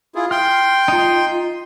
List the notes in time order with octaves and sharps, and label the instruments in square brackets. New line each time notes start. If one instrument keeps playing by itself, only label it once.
[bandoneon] E4 F4 G#4
[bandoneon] G5 C6 [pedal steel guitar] F6
[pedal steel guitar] D#4 F4